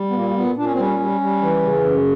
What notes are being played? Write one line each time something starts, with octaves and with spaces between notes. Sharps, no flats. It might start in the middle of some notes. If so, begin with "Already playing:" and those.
Already playing: G3
B3
A#2 A#3
A#3
A#2 B3
A#2 D4
C#4
C4
G3 C#4
G3
G3
E3
C#3
F#2